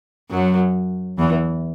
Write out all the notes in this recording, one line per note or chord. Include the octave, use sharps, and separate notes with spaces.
F#2 F#3
E2 E3